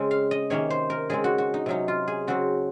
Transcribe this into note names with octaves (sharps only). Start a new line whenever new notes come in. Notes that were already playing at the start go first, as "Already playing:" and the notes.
Already playing: C#3 G#3 C4
F5
D#5
C3 D#3 A#3 C#4 C#5
C5
A#4
C#3 G#3 C4 G#4
F#4
F#4
D#4
C3 F#3 C#4 D#4
F4
G#4
C#3 F#3 C4 F#4